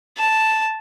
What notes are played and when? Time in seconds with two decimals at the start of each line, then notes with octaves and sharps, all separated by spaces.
0.18 A5